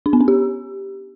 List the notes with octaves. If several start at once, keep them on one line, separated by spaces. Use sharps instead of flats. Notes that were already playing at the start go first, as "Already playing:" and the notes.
D4
B3
C#4
G4